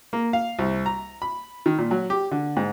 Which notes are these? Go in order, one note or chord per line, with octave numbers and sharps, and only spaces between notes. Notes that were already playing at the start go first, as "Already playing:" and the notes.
A#3
F5
C2
A#5
B5
D#3
A#2
F#3
G4
D3
G#2